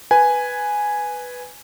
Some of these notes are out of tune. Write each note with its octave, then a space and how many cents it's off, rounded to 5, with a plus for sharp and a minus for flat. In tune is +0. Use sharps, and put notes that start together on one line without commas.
B4 +0 G#5 +0